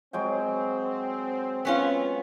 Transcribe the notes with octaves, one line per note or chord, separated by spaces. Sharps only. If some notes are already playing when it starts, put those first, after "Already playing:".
F#3 G#3 C4 G5
B3 C#4 F4